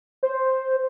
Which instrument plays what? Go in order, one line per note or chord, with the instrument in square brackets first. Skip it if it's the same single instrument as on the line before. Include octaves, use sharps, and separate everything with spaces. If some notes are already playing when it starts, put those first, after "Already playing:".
[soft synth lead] C5